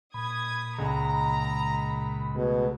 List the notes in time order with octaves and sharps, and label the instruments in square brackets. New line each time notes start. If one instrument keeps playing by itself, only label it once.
[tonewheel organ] A#2 B5 [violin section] D#6 G#6
[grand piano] C#2 G#3 [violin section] A#5
[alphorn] B2 [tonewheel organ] A3 G#4